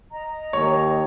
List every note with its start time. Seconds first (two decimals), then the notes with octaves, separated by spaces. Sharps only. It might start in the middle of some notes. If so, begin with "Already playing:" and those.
0.12 D#5 A#5
0.53 D#2 C#5